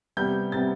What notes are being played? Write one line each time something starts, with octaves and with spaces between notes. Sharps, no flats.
C3 G3 B3 G6
C3 G3 B3 A6